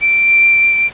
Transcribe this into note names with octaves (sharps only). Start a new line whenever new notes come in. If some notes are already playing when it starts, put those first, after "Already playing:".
D7